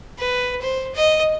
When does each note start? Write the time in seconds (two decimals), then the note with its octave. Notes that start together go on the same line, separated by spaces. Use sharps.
0.18 B4
0.61 C5
0.95 D#5